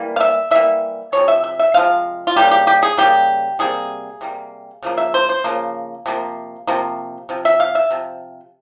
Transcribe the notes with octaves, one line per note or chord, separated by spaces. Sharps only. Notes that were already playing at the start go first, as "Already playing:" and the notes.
Already playing: E3 G3 A#3
F5
E5
E3 G3 A#3 E5
C3 F3 G#3 C#5
E5
E5
E5
C3 F3 G#3 F5
F4
C#3 G3 A#3 G4
G4
G4
G#4
C#3 G3 A#3 G4
C3 G3 A#3 G#4
C3 G3 A#3
C#3 F3 A#3
E5
C5
C5
C#3 F3 A#3
C3 F3 A#3
C3 F3 A#3
C3 F3
E5
F5
E5
C3 F3